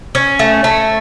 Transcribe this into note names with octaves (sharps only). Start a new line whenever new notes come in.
C#4
A3
A3